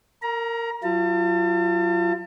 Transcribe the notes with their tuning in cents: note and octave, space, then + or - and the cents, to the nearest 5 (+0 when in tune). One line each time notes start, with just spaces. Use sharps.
A#4 -15 A#5 +25
F#3 +0 F4 -35 A5 +35